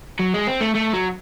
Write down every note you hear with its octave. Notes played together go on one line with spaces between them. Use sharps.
F#3
G#3
C4
A3
A3
F#3